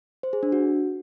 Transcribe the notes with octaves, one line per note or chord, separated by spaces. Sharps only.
C5
G#4
D4
F#4